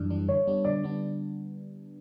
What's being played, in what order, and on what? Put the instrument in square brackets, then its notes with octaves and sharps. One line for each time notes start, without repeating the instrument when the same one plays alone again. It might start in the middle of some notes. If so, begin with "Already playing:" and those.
Already playing: [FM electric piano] F#2 E3 G3 D4
E3 G3 D4
[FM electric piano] D3 [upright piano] C#5
[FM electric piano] G3 B3 D4
[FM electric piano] D3 [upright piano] D5
[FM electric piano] G3 B3 D4